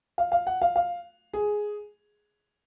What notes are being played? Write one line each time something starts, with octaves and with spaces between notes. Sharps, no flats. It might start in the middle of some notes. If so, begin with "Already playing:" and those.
F5
F5
F#5
F5
F5
G#4